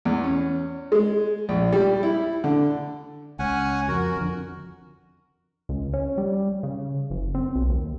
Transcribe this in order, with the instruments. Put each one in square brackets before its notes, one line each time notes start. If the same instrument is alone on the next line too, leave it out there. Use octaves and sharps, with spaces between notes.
[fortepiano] E2
C#4
G#3
A#1
G3
E4
D3
[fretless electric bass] C#2 [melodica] C#4 F#5 G#5
[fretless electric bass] F2 [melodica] F#4 A#4
[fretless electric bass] F2 D3
[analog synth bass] C#2
C#4
G3
C#3
F#1
C4
B1
D#2